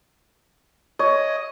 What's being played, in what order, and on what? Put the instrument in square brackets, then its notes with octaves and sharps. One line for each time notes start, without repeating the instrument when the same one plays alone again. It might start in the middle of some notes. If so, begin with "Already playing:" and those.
[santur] C#5 [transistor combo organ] D#5